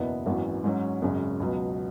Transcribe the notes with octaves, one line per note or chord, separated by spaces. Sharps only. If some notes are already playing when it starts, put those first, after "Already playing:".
Already playing: F#1 E2 B2 B3 E4
G#1 F#2 E3 B3 F#4
G#2 F#3 C#4 F#4
G#1 F#2 C#3 G#3 C#4
C#2 B2 F#3